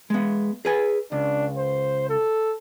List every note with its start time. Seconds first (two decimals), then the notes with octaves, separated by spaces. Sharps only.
0.10 G#3 B3
0.65 G#4 B4 G#5
1.12 C#2 D4
1.57 C5
2.09 A4